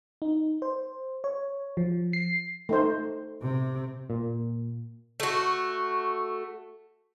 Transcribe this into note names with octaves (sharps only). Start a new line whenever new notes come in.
D#4
C5
C#5
F3
C7
A3 D#4 C5
C3
A#2
A3 F#4